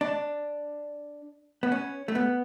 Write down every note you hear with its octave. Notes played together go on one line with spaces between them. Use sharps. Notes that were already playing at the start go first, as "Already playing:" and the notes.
D4
B3
C#4
A3
B3